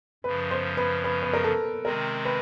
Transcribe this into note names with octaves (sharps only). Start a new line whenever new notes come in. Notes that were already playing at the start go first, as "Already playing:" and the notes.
F#2 C#3 F3 B4
C5
B4
B4
B4
A#4
A4
C3 D#3 G#3 C4 A#4
B4